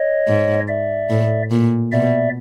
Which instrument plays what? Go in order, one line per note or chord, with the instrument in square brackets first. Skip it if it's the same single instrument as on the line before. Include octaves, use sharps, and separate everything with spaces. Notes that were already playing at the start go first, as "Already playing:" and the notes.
Already playing: [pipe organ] C#5 D#5
[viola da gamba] G#2
[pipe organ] D5 E5
[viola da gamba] A2
A#2
[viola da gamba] B2 [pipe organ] D5 E5